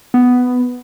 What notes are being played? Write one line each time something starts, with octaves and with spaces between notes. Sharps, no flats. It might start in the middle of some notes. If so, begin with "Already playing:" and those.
B3